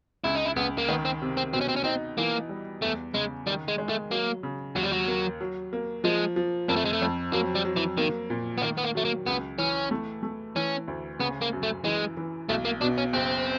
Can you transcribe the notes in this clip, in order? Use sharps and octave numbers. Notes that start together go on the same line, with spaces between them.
C#2 E4
D#4
E4
C#2 B3
A#3
D#3 B3
C4
C3
C4
B2 C4
C#4
C4
C#4
C4 D#4
E3 A#3
G3
E2 A3
C#3 G#3
D#3 G3
G#3
G#3
A3
F#3 A#3
C#3
D#2 F#3
G3
F#3
A#3
F#3
A#3
F3 G#3
F3
F2 A#3
A3
G#3
A3
F2
F#3 A#3
G3
F#3
E3
D#3 A#3
A#2
B3
D#3 A#3
B3
A#3
F#3 A3
A#3
C#2 B3
E3 C#4
A3
A3
E3 C#4
D2
C#3 B3
A#3
F#2
A3
E3 G#3
E3
B1 A3
A#3
B2 D4
C#4
F#1 C4